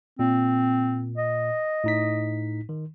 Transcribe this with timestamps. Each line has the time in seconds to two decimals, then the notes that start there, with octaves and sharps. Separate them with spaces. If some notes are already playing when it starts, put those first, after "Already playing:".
0.19 A#2 C4
1.17 D#5
1.84 A2 D#4 B6
2.69 D#3